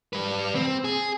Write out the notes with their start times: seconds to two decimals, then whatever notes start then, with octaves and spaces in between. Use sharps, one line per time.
0.13 G3 B4
0.55 C4
0.84 G#4